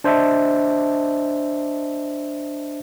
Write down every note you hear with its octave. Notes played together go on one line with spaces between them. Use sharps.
D4 C5 D#5 E5 A5